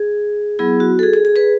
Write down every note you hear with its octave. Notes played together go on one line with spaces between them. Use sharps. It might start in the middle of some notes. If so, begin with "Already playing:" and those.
Already playing: G#4
F#3 B3 E4 G#4
F#4
A4
G#4
G#4
G#4
G#4 B4